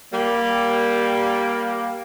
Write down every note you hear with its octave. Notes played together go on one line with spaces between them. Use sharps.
G3 A#3